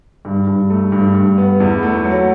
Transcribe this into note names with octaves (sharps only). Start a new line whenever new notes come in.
G2
G2
A3
G2
G2
B3
E2
A3
F#3